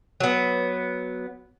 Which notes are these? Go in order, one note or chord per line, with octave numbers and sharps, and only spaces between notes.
F#3 B3